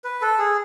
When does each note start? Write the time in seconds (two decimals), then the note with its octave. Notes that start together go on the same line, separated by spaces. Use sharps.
0.04 B4
0.21 A4
0.39 G#4